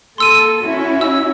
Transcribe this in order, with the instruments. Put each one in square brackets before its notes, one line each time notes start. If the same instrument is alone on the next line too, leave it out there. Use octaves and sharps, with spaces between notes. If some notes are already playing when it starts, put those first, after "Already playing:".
[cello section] A#3 A4 [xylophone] C6 E6 D#7
[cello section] C#4 E4 F#4
[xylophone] E6